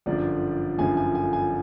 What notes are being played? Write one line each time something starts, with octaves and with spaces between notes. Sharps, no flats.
G1 F#2 D3 F3 D5
G1 F#2 D3 F3 G#5
G#5
G#5
G#5